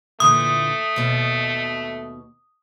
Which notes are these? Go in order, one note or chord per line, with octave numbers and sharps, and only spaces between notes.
A#2 D3 E3 A3 D#6
D#2 B2